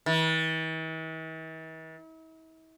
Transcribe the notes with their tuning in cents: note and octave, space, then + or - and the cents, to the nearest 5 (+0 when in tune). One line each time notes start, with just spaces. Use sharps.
E3 -45